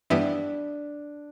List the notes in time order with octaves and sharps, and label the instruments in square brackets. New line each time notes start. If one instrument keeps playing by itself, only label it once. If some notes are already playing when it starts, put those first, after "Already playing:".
[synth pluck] G2 E3 G3 B3 E4 [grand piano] D4